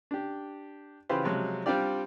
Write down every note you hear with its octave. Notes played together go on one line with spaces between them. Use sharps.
D4 G4
C#3 E3 F4 G4 B4 C5
C3 F3 F#3 G#3
G3 C4 D4 F4 G4 D5